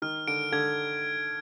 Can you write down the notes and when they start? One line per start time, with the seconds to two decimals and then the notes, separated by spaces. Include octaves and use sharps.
0.02 D#3 F6
0.27 D3 D7
0.52 D3 G#6